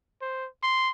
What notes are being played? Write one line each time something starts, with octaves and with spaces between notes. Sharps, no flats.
C5
C6